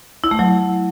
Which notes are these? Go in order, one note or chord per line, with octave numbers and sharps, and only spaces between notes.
E4
A3
F#3